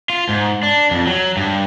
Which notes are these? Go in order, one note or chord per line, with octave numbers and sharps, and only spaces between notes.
F4
G#2
D4
F2
F#3
G2